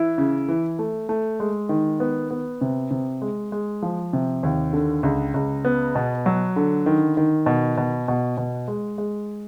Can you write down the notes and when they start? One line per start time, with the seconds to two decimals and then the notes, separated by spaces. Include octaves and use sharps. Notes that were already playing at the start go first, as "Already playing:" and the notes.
Already playing: E3 E4
0.18 C#3
0.48 E3
0.79 A3
1.09 A3
1.40 G#3
1.69 D#3
2.00 B3
2.31 B3
2.61 C3
2.91 C3
3.22 G#3
3.52 G#3
3.82 F3
4.13 C3
4.43 D#2
4.73 D3
5.03 C#2
5.34 C#2
5.65 B3
5.95 B2
6.26 F#3
6.56 D3
6.86 D#3
7.17 D#3
7.46 B2
7.77 B2
8.08 B2
8.37 B2
8.68 G#3
8.98 G#3